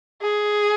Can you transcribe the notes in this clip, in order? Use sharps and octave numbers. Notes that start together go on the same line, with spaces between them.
G#4